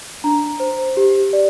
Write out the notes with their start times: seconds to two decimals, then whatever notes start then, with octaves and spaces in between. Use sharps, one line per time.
0.24 D4 A#5
0.60 C5
0.97 G4
1.33 D5